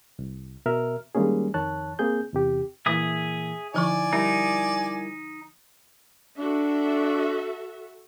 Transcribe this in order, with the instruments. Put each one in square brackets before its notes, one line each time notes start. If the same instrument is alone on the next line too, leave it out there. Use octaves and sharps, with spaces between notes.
[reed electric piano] C2
B2 A#4 E5 F6
D#3 G3 G#3 A#3 C#4 G#4
F2 D#3 C#5 A5 F#6
A#3 C4 G#4 G6
E2 C3 G4
[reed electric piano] A#2 E3 A#3 [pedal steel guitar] G#4 E5 D#6
[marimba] D3 F3 C#6 [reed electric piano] D#4 E4 [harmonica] D5 G#5
[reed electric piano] G3 E4 A#4 [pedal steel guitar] D#4
[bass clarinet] D4 [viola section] F#4 A4 E5